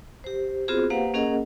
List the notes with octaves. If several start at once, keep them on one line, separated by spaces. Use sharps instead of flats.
G4 C5
B3 C4 F4 F#4 G#4 C5
A#3 G4 B4 C5 F5 F#5
A#3 C#4 G#4 A#4 D#5 F#5